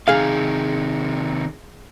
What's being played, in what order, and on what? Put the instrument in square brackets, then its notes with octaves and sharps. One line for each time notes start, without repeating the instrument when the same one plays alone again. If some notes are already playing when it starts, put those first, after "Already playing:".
[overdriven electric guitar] C3 D#3 [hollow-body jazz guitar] G#4 F5